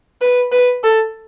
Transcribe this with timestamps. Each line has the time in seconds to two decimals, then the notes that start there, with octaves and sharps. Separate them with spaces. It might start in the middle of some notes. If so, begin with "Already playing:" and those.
0.21 B4
0.52 B4
0.84 A4